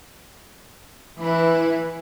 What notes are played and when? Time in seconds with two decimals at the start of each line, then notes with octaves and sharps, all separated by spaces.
1.20 E3 E4 B4